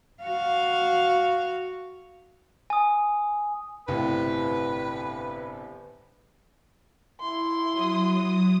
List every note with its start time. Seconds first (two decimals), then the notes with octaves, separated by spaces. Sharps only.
0.23 F#4 F5
2.70 G#5 D#6
3.88 G1 A2 C3 B4
7.21 E4 C6
7.73 F#3 D#6